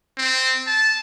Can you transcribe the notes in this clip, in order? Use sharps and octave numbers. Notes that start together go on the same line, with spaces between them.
C4
A5